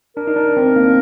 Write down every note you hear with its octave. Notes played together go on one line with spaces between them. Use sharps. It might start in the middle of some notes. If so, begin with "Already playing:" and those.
D4 A#4
D#4
D4
C4
A#3